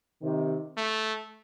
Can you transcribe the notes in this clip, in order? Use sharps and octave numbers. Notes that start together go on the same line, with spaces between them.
C3 D#3
A3